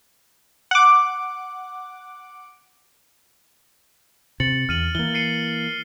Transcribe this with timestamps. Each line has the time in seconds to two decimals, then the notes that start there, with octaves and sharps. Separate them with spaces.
0.71 F#5 D6
4.40 C3 A6 C#7 F#7
4.69 E2 F6 D#7 F#7
4.95 E3 A#3 G7
5.14 C7 C#7 D#7